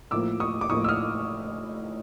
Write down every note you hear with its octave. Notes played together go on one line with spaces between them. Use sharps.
A2 F3 A#3 D6 E6
C#6 D#6
D6
A2 F3 A#3 C#6 D#6
E6
D#6 F6